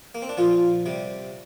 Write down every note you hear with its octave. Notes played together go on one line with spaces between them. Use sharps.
A#3
C4
D4
A#2 F3 F4
C3 G3